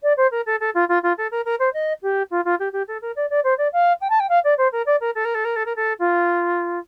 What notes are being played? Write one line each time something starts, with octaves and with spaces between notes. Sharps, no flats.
D5
C5
A#4
A4
A4
F4
F4
F4
A4
A#4
A#4
C5
D#5
G4
F4
F4
G4
G4
A4
A#4
D5
D5
C5
D5
F5
G5
A5
G5
F5
D5
C5
A#4
D5
A#4
A4
A#4
A4
A#4
A4
A#4
A4
F4